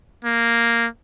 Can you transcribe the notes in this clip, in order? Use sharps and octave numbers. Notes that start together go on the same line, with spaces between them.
A#3